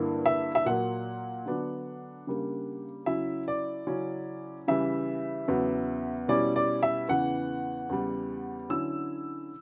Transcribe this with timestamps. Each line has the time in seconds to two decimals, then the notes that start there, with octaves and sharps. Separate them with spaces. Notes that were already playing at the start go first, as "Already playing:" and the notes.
Already playing: G2 D3 A#3 E4
0.26 E5
0.55 E5
0.66 A#2 F#3 A#3 F#5
1.46 D3 F#3 B3 D4
2.27 C#3 G3 A#3 D4
3.06 C#3 F#3 C#4 E4 E5
3.48 D5
3.87 C#3 F#3 C#4 E4
4.68 C#3 E3 G3 E5
5.48 E2 C#3 F#3 B3
6.28 B2 G3 C#4 E4 D5
6.56 D5
6.83 E5
7.08 E2 C#3 E3 F#5
7.89 E2 C#3 G3
8.70 D3 F#3 C#4 E4 E6